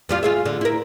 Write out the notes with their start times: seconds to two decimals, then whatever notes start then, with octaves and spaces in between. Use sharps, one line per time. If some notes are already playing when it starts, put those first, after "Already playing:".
0.09 F2 G3 F4
0.23 F4 G#4 E5
0.45 D3
0.61 E4 A#4